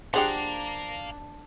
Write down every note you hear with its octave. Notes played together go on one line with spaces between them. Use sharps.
F3 D4 G4 G#4 F5 F#5 A#5 C6